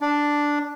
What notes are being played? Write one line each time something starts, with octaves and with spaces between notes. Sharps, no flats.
D4